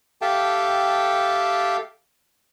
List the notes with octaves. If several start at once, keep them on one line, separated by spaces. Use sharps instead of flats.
G4 A4 E5 F5 G5 A5